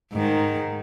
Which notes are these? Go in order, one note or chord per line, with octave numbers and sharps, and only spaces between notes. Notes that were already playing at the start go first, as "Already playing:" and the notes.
G#2 D#3